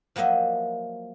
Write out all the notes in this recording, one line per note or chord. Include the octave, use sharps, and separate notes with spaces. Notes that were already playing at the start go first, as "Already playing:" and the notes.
F3 F#3 A#3 D#5 E5